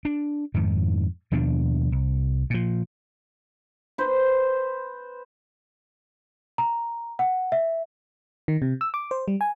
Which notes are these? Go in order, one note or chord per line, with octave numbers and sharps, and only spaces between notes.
D4
F2 G#2 D#3
D#2 B2 F3 D4
C2
A#2 F3
B4 C5
A#5
F#5
E5
D#3
C3
E6
D6
C5
G3
G#5